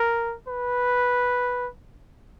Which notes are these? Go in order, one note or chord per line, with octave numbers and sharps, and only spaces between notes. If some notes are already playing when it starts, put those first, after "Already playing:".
Already playing: A#4
B4